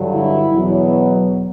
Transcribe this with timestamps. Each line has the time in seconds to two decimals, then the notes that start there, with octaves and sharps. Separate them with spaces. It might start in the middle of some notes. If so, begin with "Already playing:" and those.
Already playing: G2 D3 F#3
0.15 E4
0.52 E2 B2 F#3 B3